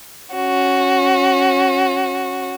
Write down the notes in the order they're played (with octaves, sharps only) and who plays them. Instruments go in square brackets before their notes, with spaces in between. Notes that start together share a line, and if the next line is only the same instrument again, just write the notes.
[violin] C#4 F#4